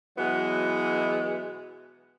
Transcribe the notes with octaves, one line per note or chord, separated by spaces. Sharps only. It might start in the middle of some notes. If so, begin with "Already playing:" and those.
B2 E3 F#3 G#3 B3